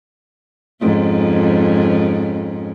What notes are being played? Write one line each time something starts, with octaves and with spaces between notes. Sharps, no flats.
F2 G#2 C#4